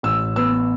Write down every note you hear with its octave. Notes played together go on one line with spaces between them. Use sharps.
A1 E6
B3 E6